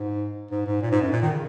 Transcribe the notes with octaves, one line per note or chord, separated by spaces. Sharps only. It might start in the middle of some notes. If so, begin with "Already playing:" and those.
Already playing: G#2
G#2
G#2
A#2
G#2
F#2
A#2
D#3
C#3